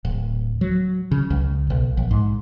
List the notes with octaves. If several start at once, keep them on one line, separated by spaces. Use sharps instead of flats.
D1
F#3
C#3
C#2
B1
A#1
G#2